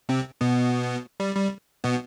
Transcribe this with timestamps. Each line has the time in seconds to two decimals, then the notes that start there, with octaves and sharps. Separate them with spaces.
0.09 C3 C4
0.41 B2 B3
1.20 G3
1.36 G3
1.84 B2 B3